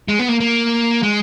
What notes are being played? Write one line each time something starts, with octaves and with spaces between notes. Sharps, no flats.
G#3
B3
A#3
A#3
G#3